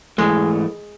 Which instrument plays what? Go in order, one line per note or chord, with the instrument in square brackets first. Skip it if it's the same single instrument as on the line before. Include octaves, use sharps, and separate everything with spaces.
[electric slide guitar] G#2 E3 A3 [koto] G#3